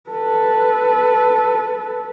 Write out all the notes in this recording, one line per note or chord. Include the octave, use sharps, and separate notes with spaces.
A4 B4